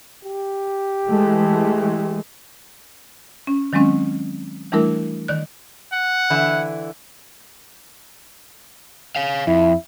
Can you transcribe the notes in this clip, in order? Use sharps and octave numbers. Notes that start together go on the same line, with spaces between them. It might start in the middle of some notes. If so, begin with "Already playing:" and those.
G4
E3 G#3 A3
C#4
D#3 F#3 G#3 C4 C#4
E3 G3 A3 D4 E4 A#4
D#3 D5 F#6
F#5
D3 E3 E4
C#5 F5
F2 E4